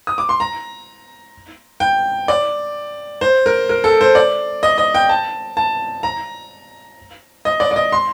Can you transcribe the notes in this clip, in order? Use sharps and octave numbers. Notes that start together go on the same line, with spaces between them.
D#6
D6
C6
A#5
G5
D5
C5
A#4
A#4
A4
C5
D5
D#5
D#5
G5
A5
A5
A#5
D#5
D5
D5
D#5
C6